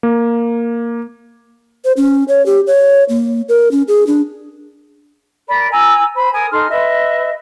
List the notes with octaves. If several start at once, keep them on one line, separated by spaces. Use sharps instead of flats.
A#3
C5
C#4
C#5
G4
C#5
A#3
A#4
C#4
G#4
D4
A#4 D5 B5
G#5 A#5 E6
C5 B5
A#4 G#5 D#6
D#4 A4 C6 F6
B4 D#5 E5